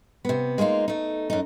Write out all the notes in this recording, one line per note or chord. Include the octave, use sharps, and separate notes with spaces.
C3 B3
G#3 A#3 C#4 D#4 F4
A3 D#4
F#2 D#4